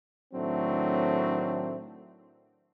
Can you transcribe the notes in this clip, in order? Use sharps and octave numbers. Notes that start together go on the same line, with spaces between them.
A2 D#3 F#3 A3 C4 D4